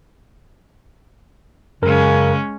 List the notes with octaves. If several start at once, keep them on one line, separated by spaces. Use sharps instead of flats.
F#2 C#3 G#3 C#4 A#4 A#5